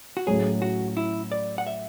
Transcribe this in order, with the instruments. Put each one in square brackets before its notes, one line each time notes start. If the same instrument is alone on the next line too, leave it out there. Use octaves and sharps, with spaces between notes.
[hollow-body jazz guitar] F#4
[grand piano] A2 F#3 C#4 [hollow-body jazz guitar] G#4
[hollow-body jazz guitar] F#4
E4
D5
F#5
E5